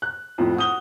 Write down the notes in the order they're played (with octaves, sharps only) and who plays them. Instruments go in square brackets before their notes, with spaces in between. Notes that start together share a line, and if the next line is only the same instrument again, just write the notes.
[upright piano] F#6
F2 A2
F#4 D#6 G7